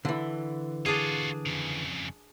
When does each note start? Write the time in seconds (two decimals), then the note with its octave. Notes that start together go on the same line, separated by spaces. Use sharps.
0.05 D3 E3
0.86 D4 F4 F#4 G#4
1.46 F2 C#3